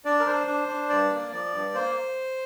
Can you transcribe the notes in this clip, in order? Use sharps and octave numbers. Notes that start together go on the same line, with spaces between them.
D4 D5
A#4
D4 C5
D4
D4
G2 D5
A#3
F3 D5
G2
A#3 C5